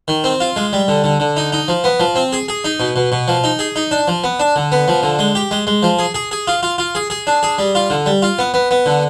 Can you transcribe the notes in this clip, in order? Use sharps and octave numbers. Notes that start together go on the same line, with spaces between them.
D#3
C4
F4
G#3
G3
D3
D3
D3
D#4
D#4
F3
B3
F3
C4
G#4
G#4
D#4
B2
B2
B2
F3
D#4
G#4
D#4
D4
F3
B3
D4
D3
B3
F3
D3
G#3
G4
G#3
G#3
F3
G#4
G#4
G#4
F4
F4
F4
G#4
G#4
D4
G#4
G3
F4
D3
G3
F4
B3
B3
B3
D3